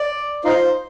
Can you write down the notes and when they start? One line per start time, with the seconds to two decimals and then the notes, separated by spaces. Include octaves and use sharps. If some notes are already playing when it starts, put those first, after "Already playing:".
Already playing: D5
0.45 D#4 F4 C5